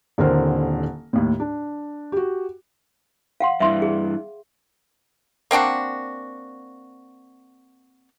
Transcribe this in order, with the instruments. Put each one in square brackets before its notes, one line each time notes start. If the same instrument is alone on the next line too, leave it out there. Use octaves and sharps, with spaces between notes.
[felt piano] D#1 D3 C4 E4 A#4 C5
D#2 A2
D4
F#4 G4
[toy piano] F5 F#5 C6
[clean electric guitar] G2 E3 [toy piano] E5 C6
[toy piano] G#4
[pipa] A#3 C4 D4 F#4